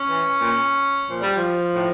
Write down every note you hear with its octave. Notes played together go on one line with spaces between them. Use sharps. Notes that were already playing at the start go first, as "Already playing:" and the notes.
Already playing: C#4
E3
A#2
A#2 F3
G3
F3
A2